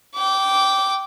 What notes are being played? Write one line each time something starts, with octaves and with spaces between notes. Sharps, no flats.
G5 D6